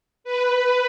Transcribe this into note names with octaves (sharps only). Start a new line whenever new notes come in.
B4